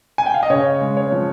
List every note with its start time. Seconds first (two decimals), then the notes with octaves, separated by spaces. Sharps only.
0.18 G#5
0.26 G5
0.34 F5
0.43 D#5
0.50 C#3 C#5
0.81 G#3
0.97 C#5
1.12 F3